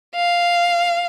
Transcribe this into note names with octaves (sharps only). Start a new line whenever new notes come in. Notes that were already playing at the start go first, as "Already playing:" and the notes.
F5